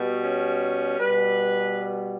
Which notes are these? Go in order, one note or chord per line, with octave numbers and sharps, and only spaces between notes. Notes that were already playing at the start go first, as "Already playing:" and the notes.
Already playing: B2 G3 B3
C#4
B2 G3 B4